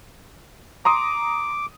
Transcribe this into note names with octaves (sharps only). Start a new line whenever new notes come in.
A#5 C6 D6 D#6